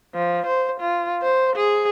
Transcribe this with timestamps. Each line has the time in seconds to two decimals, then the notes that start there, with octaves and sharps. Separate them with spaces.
0.15 F3
0.46 C5
0.80 F4
1.22 C5
1.56 G#4